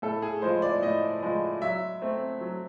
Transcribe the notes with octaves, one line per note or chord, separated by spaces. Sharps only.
A2 A4
G#4
F3 G#3 C5
D5
A2 D#5
F3 G#3
F#3 E5
A3 C4
F#3